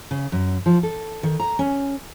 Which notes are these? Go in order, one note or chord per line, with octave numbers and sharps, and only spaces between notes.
C#3
F#2
F3
A4
D#3
A#5
C#4